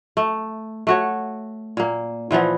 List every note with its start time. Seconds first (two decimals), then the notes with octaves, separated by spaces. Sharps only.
0.17 A3
0.87 A3 F#4 C#5
1.77 A#2 A#3
2.31 A#2 E3 F3 B3